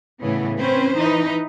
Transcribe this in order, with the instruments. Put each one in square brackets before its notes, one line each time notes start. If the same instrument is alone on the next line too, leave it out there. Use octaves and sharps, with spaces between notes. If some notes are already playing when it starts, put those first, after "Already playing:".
[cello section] A2 C#3 E3 B3
C4 C#4 B4 C5
E3 D#4 B4